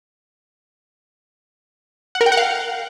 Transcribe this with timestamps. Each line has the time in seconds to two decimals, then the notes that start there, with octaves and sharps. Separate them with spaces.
2.15 F#5
2.21 A#4
2.26 G5
2.32 F#5
2.37 F5